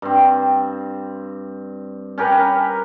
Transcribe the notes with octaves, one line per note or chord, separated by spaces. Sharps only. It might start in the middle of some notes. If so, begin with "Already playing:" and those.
G2 C4
C#4 G4 A#4 B4